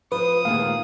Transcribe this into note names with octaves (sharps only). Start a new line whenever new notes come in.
F3 B4 D#6
D#2 A#2 G#4 F5